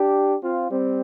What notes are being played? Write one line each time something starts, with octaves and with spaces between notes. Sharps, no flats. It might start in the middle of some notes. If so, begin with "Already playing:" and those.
Already playing: D4 G4
C4 F4
G3 C4